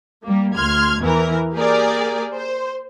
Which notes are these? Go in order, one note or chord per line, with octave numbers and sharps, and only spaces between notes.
G3 A#3
D2 C6 F6 G#6
E2 E3 A#4
A#3 G4 G#4 A#4 D5
C5